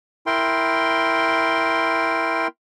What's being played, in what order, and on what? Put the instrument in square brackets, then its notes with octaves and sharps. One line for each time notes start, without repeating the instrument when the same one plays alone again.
[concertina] E4 A#4 G5 C6